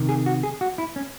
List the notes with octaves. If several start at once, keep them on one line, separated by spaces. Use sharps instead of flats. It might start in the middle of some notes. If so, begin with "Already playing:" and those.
Already playing: C3 D#3
G#4
F#4
G#4
F#4
E4
C#4